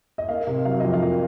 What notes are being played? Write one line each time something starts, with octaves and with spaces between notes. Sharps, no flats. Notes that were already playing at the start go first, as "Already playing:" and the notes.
D#5
A#3 F5
C3
F#3 F5
F2 D#5
F5
A#3